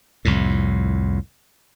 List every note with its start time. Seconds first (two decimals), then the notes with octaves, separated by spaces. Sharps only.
0.25 C2 F2 A2